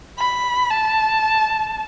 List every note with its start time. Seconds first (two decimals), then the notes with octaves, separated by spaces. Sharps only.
0.18 B5
0.70 A5